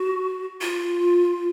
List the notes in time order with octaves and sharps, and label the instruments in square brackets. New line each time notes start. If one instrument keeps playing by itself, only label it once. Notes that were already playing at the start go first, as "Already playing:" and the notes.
Already playing: [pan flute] F#4
F4